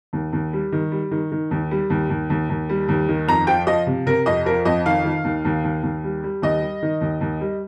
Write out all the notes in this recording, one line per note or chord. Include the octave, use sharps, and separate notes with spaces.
D#2
D#2
G3
D#3
G3
D#3
D#3
D#2
G3
D#2
D#2
D#2
D#2
G3
D#2
D#3
F2 A#5
F3 G5
F3 D#5
C3
C3 A#4
F2 D#5
F3 A#4
F2 D#5
D#3 F5
D#3
D#2
D#2
D#2
D#2
G3
G3
D#2 D#5
G3
D#3
D#2
D#2
G3